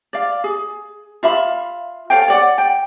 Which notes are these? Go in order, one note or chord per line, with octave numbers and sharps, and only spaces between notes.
D5 F5
G#4
F4 E5 F5 B5
A4 C#5 F5 G5
C#5 D5 F#5
G5